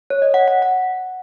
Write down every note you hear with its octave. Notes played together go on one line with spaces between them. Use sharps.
C#5
D#5
F#5
F#5
F#5